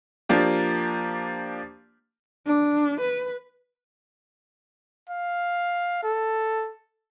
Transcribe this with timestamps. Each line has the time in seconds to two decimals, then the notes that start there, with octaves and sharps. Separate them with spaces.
0.29 F3 A#3 D4 G4
2.47 D4
3.00 B4
5.09 F5
6.03 A4